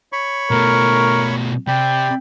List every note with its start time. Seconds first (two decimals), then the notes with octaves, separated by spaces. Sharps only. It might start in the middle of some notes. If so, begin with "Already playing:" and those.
0.13 C#5 B5 C#6
0.51 B2 A3 A#4
1.68 C3 D5 G5 B5